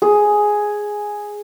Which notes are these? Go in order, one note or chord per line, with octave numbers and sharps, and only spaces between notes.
G#4